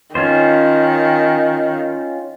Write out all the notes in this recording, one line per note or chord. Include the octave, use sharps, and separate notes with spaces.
D#3 C#4 F4 C5